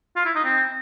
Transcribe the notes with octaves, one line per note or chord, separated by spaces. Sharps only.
F4
E4
D#4
C4